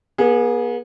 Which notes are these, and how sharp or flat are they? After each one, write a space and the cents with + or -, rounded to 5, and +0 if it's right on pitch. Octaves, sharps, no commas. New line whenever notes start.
B3 -45 G#4 +0